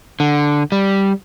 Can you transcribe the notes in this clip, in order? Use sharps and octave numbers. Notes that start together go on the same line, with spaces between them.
D3
G3